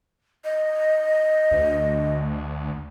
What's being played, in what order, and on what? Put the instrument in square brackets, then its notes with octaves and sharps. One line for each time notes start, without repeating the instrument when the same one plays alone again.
[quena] D#5
[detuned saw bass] D2